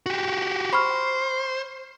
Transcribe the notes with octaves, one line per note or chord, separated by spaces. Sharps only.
F#4 G4
C5 B5 C#6 F6